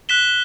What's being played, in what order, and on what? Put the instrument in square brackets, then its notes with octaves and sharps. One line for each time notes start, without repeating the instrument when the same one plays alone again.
[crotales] F#6 B6 E7 G7